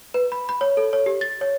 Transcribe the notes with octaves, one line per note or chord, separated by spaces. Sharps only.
B4
B5
B5
C#5
A4
C#5
G4
A6
C#5